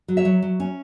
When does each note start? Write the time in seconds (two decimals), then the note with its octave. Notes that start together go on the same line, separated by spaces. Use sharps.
0.08 F#3
0.17 C#5 E5
0.25 F#3
0.43 F#3
0.60 C#4